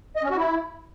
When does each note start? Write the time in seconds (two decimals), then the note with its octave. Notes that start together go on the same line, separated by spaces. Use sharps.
0.16 D#5
0.23 C#4
0.30 F#4
0.37 E4